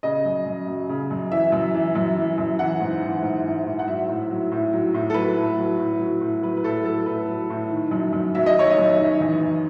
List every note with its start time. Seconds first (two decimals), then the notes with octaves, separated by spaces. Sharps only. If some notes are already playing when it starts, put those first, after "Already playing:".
0.03 C#3 D#5
0.25 F#2
0.46 F#2
0.67 F#3
0.89 C#3
1.11 F#2
1.31 E3 E5
1.52 F#2
1.74 E3
1.95 F#2
2.16 E3
2.38 F#2
2.59 E3 F#5
2.80 G#2
3.02 E3
3.22 G#2
3.44 E3
3.65 G#2
3.79 F#5
3.88 F#3 E5
4.08 A2
4.30 F#3
4.52 A2
4.73 F#3
4.94 A2
5.10 A4
5.14 F#3 B4
5.37 A2
5.57 F#3
5.79 A2
6.00 F#3
6.21 A2
6.43 F#3 B4
6.57 B4
6.64 A2 A4
6.85 F#3 A4
7.06 A2 B4
7.29 F#3
7.50 A2
7.70 D#3
7.91 F#2
8.13 F#2
8.35 F#3 E5
8.46 D#5
8.56 D#3 C#5
8.70 D#5
8.78 F#2
8.99 D#3
9.20 E2
9.41 E2